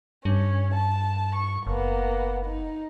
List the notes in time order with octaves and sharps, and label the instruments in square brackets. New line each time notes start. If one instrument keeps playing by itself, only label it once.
[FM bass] G2 [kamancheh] C#4
[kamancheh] A5
C#6
[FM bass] F#1 [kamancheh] A#3 B3
[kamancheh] D#4